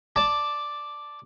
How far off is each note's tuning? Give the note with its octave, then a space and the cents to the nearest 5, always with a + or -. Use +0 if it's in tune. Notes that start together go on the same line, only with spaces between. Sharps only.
D5 +0 A5 +0